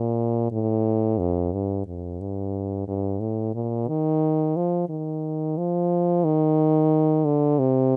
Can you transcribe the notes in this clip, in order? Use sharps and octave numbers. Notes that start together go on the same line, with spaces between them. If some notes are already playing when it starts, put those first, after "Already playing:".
Already playing: A#2
A2
F2
G2
F2
G2
G2
A2
A#2
D#3
F3
D#3
F3
D#3
D3
C3